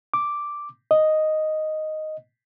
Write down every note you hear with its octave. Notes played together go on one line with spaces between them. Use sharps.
D6
D#5